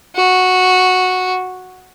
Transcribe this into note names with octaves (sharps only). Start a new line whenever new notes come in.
F#4